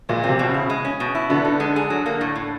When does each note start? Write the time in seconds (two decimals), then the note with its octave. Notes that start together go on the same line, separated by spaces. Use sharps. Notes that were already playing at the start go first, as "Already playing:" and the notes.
0.09 A#2 G#3
0.24 C4
0.29 C3
0.39 B2
0.49 C#3 E4
0.70 G#3
0.85 C#4
1.00 B2
1.15 E4
1.30 D3 B3
1.45 D#4
1.60 G#3
1.76 G#4
1.90 F#3
2.06 A#3
2.21 A2
2.36 A2